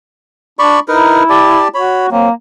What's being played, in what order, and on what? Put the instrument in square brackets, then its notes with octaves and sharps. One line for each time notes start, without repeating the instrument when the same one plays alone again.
[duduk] D4 [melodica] D5 B5 C#6
[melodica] D#4 A#4 B4 [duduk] E4
[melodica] G4 D5 A5
[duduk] F#4 [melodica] C#5 B5
[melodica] F#3 C4 [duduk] A#3